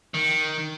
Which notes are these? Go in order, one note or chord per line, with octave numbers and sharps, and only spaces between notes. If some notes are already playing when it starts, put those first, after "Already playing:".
D#3